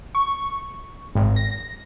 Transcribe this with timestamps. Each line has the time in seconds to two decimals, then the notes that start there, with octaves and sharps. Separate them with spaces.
0.15 C#6
1.15 G#1
1.36 A#6